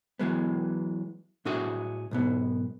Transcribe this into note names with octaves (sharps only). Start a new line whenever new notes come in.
E3 F#3 G#3 B3
A2 D4 F#4 G#4 E5
B1 G#2 B3